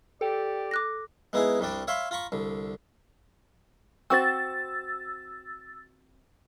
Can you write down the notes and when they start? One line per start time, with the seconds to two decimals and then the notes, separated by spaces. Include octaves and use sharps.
0.21 G4 A4 D5
0.71 D6 F#6 A#6
1.33 G#3 B3 D#4 E4 G#4
1.60 C2 C3 G3 D4 D5
1.87 C#5 E5 F5 B5 C6
2.11 F4 A#5 B5 C#6
2.32 C2 D3
4.10 C4 F#4 C5 E6 A6